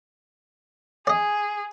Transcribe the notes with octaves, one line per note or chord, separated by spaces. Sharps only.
G#4 D5 D#5